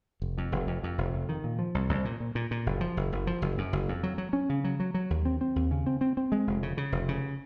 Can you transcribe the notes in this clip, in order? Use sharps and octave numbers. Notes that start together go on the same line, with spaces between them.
F1
F2
F1
F2
F2
F1
F2
D#3
A#2
F3
C2
C2
A#2
A#2
A#2
A#2
F#1
F3
F#1
F#1
F3
F#1
F#2
F#1
F2
F#3
F#3
C#4
C#3
F#3
F#3
F#3
D#2
C4
C4
D#2
C#3
C4
C4
C4
G#3
F1
C#3
C#3
F1
C#3